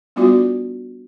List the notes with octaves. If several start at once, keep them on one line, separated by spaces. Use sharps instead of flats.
G3 B3 D4 F4 F#4 D5